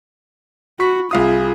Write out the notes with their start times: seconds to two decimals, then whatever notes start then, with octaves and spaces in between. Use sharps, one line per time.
0.80 F#4 B5 C#6 B6
1.11 C2 F4 G#4 F5 D#6